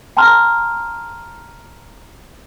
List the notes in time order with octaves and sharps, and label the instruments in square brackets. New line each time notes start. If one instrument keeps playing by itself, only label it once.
[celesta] G5 A5 A#5 C6 F6